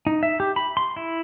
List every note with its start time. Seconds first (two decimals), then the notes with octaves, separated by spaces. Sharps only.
0.07 D#4
0.23 E5
0.40 G4
0.56 B5
0.77 C6
0.96 E4